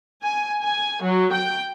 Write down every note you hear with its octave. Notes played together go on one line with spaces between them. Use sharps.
G#5
G#5
F#3
G5